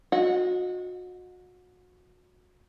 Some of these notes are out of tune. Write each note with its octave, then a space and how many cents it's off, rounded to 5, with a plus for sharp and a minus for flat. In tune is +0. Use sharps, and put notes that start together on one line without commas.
F#4 -30 D#5 +0 F#5 +0